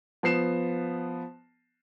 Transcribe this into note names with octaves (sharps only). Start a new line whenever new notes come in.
F3 B3 C7 E7